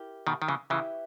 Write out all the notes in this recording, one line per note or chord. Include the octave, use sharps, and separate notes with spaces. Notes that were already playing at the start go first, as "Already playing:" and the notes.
Already playing: E4 G4 A#4
B2 D#3
D#3
C#3 E3
C#3 E3 E4 G4 B4 E5